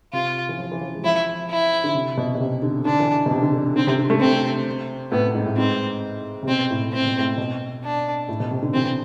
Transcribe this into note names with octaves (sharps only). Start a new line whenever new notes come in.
C3 F4
E3
F3
E3
F3
G#3
F3 E4
E4
D3
C3
B2
B2
C3
D3
D3 D4
E3
B2
C3
D3
D3
D3 C4
C3
D3
A3
C3 C4
A2 B3
G#2
A2
G#2 C4
C3
B2 C4
A2
A2 C4
B2
A2
B2
D4
A2
B2
C3
D3
E3 C4